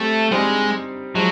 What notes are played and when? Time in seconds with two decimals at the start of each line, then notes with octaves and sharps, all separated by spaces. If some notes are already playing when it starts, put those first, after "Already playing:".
Already playing: G3 A3 C4 G4
0.31 G3 G#3 C4 D#4 G4 C5
1.15 F3 F#3 G#3